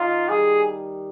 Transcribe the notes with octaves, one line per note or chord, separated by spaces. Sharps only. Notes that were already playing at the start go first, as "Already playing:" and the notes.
Already playing: D#3 F4
G3 G#4